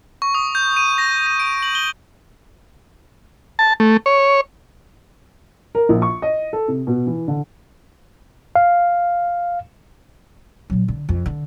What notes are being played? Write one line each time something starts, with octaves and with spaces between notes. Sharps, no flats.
C#6
D#6
G6
D#7
A#6
A#6
D7
F#7
G7
A5
A3
C#5
A#4
A#1
C#6
D#5
A4
C3
B2
E3
D3
F5
A#2 F#3
D3
F2
D3